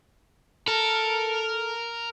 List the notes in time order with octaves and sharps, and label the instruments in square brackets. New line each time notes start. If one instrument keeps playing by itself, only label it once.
[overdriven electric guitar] A4 [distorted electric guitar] A#4